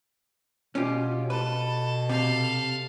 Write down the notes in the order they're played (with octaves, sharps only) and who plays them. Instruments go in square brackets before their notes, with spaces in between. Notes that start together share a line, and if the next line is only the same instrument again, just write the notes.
[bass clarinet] B2 [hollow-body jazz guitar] C#4 F4 G4
[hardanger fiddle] A4 [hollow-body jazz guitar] B4
[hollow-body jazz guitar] C3 [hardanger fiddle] A4 F5